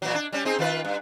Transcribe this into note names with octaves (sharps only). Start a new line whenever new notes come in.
A#2 E3 F#3
D4
G3 C#4
C4 D#4 G#4
D#3 F4 B4
G2